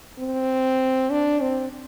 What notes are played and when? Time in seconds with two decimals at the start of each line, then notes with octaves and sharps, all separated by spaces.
0.19 C4
1.11 D4
1.42 C4